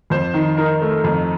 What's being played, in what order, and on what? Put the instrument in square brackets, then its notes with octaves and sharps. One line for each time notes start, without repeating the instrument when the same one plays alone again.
[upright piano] F2 C5
D#3
D#4 A#4
A3
F2